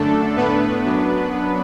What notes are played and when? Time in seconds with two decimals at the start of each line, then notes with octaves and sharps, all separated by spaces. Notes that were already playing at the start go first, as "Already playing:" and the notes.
Already playing: F#2 D3 A3 D4 A4
0.37 A2 A3 B3 D4 B4
0.85 F#2 F#3 D4